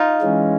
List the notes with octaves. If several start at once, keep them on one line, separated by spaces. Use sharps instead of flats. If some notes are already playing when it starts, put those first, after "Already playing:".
Already playing: D#4 F4
E3 G#3 C#4